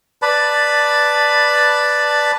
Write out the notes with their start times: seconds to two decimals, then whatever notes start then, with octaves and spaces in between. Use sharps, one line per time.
0.22 B4 D5 A5 B5